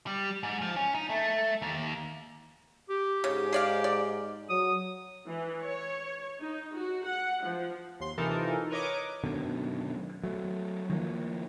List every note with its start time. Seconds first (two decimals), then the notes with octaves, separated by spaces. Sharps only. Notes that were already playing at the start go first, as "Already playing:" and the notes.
0.07 G3
0.43 G#2
0.62 F3
0.76 C#4
0.95 D#4
1.10 A3
1.62 D#2
2.89 G4
3.24 G#2 C#3
3.53 G#4 D5 F5
3.84 D5
4.49 F#3 D#6
5.28 E3
5.62 C#5
6.40 D#4
6.75 F#4
7.05 F#5
7.43 F3
8.00 D#2 C6
8.18 C3 E3 D#4 F4 A4 A#4
8.70 A#4 B4 C#5 D#5 C#6 D6
9.24 F#2 B2 D3 D#3
10.24 F#3 A3
10.90 D#3 F3 A3 A#3